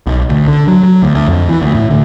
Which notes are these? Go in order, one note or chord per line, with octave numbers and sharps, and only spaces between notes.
B1
D2
D3
F#3
F#3
D2
D2
F2
E3
D2
A2
D2